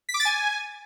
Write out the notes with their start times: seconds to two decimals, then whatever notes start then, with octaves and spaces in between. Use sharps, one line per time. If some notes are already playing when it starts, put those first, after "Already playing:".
0.09 B6
0.14 D6
0.20 A6
0.25 G#5